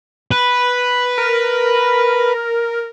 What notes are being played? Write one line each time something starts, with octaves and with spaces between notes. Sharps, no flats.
B4
A#4